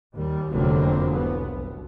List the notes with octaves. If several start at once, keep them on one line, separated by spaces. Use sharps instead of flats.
D#2 G3
F1 E2 D3 F#3 A#3 C4
C2 B3
B1